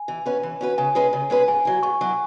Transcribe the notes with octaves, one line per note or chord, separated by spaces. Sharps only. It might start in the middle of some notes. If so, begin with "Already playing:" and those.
Already playing: G#5
E3
C#4 F#4 B4
E3
C#4 F#4 B4
C#3 G#5
G#3 C#4 G#4 B4
C#3
G#3 C#4 G#4 B4
G#2 G#5
F#3 E4
G#2 C#6
F#3 E4